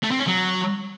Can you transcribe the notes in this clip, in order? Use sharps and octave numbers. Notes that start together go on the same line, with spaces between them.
A3
C4
C#4
F#3